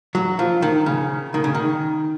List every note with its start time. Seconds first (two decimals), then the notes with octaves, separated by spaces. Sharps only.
0.15 F#3
0.39 F3
0.62 D#3
0.86 C#3
1.34 D#3
1.44 C#3
1.55 D#3